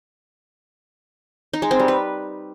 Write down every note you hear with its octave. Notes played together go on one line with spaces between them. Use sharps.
D#4
G#3
C4
G3
B4